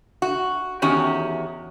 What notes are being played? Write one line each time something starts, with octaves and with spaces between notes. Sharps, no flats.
F#4
E2 D#3 C#4 F#4 G4